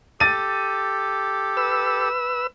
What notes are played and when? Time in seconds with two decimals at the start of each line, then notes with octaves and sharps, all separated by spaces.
0.20 G4 A4 A6 D#7
1.57 B4 E6